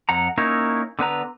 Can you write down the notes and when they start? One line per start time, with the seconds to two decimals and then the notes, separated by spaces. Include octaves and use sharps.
0.09 F2 F#5 A#5
0.37 A#3 C#4 D#4 E4 A#4 C#5
0.99 D3 B3 B4 A#5